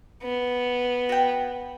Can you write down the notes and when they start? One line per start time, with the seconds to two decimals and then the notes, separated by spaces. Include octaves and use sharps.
0.22 B3
1.09 F#4 G5